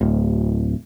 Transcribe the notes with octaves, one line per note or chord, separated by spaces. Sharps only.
D1